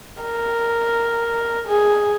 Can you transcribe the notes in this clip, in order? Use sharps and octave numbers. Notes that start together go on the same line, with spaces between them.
A#4
G#4